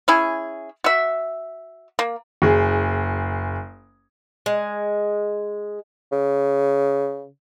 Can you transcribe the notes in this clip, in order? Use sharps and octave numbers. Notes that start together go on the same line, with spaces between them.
C#4 E4 G#4
F#4 E5
A#3
F#1 G#4
G#3
C#3